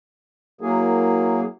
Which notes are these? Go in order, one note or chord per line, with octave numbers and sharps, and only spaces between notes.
F#3 A#3 E4 F#4 G#4 A#4